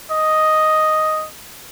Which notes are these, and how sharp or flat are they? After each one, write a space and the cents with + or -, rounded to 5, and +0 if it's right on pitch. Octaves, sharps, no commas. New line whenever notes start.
D#5 +0